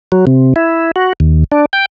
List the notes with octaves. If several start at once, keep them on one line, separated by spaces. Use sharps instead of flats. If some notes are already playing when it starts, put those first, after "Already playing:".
F#3
C3
E4
F#4
D#2
D4
G5